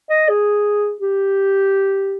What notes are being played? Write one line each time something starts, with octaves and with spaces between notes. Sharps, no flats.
D#5
G#4
G4